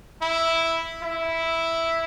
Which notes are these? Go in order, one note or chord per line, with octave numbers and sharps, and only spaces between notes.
E4
E4